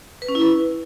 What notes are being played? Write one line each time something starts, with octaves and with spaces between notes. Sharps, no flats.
B4
C#4
E4
B4